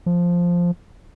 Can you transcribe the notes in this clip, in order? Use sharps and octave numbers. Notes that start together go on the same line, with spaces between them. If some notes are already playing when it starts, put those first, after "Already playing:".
F3